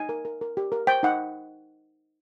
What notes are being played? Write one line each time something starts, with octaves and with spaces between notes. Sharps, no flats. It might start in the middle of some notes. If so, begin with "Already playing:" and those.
Already playing: D#4 G#5
A#4
A#4
A#4
G4
A#4
C5 G5
D#4 F#5